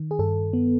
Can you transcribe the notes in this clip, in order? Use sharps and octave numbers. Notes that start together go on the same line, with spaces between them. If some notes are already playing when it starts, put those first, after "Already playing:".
Already playing: D#3
G#4
G2 A4
B3